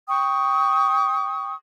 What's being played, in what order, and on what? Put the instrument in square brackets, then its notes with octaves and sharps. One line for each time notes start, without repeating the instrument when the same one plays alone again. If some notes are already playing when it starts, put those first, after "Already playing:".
[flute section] G5 C#6 D#6